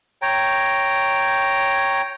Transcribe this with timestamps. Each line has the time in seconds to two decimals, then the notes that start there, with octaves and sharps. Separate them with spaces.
0.22 C#5 G5 A#5